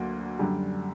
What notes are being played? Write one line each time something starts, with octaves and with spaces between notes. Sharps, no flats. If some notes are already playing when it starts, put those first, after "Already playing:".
Already playing: D2 D3 F#3 A#3
F#2 D3 G3